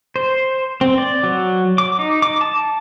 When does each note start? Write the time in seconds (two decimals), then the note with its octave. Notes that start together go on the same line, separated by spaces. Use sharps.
0.16 C5
0.81 C4
0.98 D5
1.24 F#3
1.78 D6
1.99 D#4
2.22 D6
2.41 A5